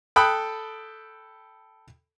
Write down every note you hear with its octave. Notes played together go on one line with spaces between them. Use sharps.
A4 G5 B5 D#6 F#6